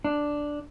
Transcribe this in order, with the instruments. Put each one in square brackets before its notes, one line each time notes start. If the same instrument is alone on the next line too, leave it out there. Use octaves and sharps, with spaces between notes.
[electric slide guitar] D4